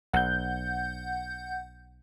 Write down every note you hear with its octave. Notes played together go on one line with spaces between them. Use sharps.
B1 F#5 G6